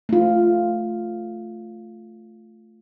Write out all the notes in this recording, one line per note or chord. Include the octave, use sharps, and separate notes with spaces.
A3 F4